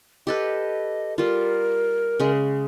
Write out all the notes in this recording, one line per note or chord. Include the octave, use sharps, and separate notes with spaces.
G4 A4 B4 D#5
G3 F4 A#4
C#3 G#3